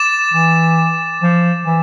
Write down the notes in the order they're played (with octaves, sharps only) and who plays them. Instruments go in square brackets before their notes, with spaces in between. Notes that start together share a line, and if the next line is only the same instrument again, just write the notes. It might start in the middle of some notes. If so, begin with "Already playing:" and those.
Already playing: [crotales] D6 A6 E7
[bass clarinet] E3
F3
E3